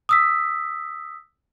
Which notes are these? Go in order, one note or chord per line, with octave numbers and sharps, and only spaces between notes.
D#6 E6 B6